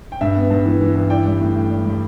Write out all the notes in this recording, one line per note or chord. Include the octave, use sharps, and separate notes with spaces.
G5
G2 E5
B3
G2
E3
E3
G2
E4 D5 G5
G3
A2
A2
G3
G3
B5